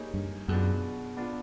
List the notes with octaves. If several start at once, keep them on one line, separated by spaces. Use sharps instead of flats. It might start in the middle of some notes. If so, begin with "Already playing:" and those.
Already playing: G3 A#3 D#4 G#4 C#5
G2
F#2 B2 G#3 B3 D4 F4
B3 D4 F4